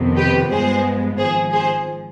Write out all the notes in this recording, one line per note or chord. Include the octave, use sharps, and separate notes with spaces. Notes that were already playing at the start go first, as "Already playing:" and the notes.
Already playing: F2 C3 D#3 B3
G4 B4
G2 F3 G#3 B3 G#4 C5
G#1 G#2 F3 G#4 C5
G#4 C5